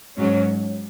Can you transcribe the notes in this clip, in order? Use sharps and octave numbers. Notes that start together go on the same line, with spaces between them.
G#2 F#3 C#4